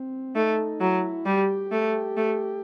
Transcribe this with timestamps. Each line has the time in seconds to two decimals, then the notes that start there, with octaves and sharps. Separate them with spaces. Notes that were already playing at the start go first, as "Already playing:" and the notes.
Already playing: C4
0.35 A3 D#4
0.81 F#3 E4
1.26 G3 G4
1.72 A3
2.17 A3